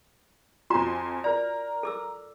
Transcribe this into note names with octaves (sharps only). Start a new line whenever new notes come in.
F2 F4 F#4 G#5 A#5 C6
A#4 D5 A#5
A4 D6 E6